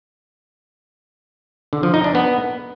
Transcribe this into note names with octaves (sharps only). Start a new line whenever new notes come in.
D3
F3
D#4
D4
B3